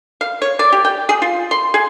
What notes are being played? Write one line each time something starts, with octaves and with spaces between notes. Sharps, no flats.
F5
C#5
D5
G4
G5
G#4
F4
C6
G#4